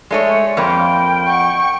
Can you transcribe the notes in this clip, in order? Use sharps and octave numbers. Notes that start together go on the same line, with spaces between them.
G#3 A3 C#5 D5 C#7 D#7
F2 A#3 G5 B5 C6
F#5 C#6